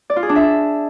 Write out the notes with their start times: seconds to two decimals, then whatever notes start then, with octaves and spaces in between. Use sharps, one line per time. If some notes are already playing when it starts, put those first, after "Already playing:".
0.10 D5
0.16 F4
0.23 G#4
0.29 D4
0.36 E5